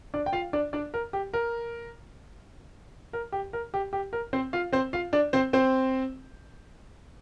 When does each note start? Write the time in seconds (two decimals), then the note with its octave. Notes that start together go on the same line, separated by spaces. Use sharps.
0.14 D4 D5
0.26 G5
0.33 F4 F5
0.53 D4 D5
0.73 D4 D5
0.94 A#4
1.13 G4
1.34 A#4
3.13 A#4
3.32 G4
3.53 A#4
3.74 G4
3.93 G4
4.13 A#4
4.33 C4 C5
4.53 F4 F5
4.73 C4 C5
4.93 F4 F5
5.13 D4 D5
5.33 C4 C5
5.53 C4 C5